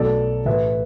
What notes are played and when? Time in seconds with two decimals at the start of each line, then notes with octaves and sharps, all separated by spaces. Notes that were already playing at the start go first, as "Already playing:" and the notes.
Already playing: B1 B2 F#3 A3 A4 D5
0.45 A1 A2 A3 B4 E5